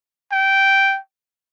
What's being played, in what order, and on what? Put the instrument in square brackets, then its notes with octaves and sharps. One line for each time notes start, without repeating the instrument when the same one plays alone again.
[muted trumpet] G5